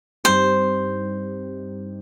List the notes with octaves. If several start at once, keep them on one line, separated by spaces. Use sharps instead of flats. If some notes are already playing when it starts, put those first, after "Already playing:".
G2 G3 C4 D#4 G4 C5